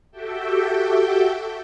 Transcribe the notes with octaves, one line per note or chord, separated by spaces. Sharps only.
F#4 G4 A4 E5 G5